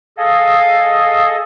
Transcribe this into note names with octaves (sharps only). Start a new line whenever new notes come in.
G#4 A4 D#5 F5